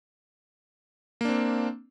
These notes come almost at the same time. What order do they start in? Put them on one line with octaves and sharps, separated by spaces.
A#3 D4 C4